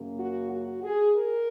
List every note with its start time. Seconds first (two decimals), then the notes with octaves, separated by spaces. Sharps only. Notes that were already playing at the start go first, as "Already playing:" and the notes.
Already playing: F#2 C#3 A#3
0.19 F#4
0.51 F#4
0.83 G#4
1.16 A#4